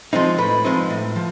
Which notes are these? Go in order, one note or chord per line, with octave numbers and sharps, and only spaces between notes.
F3 G#3 C4 D#4
A2 B4
F3 G#3 C4 D#4
A2
F3